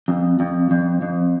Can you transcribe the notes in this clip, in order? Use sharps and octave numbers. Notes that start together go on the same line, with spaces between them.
F2
F2
F2
F2